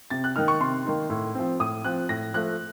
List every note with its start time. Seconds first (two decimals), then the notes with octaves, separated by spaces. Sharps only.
0.10 C3 A6
0.24 F#6
0.36 D#3 A#3 D#4 F6
0.48 C#6
0.60 C3 C6
0.85 D#3 A#3 D#4
1.10 A2
1.35 F3 C4
1.59 A2 D#6
1.85 F3 C4 F#6
2.09 A2 A#6
2.34 F3 A3 F#6